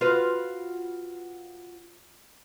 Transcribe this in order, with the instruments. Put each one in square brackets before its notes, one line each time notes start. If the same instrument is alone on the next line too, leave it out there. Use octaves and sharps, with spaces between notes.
[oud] F4 F#4 B4